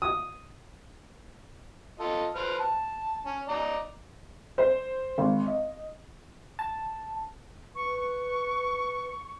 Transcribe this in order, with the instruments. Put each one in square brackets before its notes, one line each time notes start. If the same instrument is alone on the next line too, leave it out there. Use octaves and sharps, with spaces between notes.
[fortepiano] D#6
[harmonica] F4 A4 D#5
B4 C5 F6
A5
C#4
D5 D#5 A#5
[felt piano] C5
G#1
D#5
[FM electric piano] A5
[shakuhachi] B4 [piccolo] C#6
[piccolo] C#6